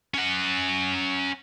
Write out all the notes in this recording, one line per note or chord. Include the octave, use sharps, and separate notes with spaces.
C#4 F#5